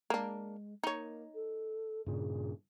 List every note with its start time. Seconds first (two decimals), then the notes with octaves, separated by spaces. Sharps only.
0.10 G#3 A#3 D4
0.83 A#3 D#4 C#5
1.34 A4
2.06 G2 A#2 C#3 G#4